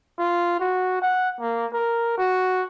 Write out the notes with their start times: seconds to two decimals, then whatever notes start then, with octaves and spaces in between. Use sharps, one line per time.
0.19 F4
0.60 F#4
1.02 F#5
1.40 A#3
1.73 A#4
2.18 F#4